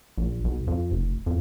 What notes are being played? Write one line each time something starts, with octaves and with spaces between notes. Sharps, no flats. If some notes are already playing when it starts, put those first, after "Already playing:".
A#1
B1
F2
F1
F2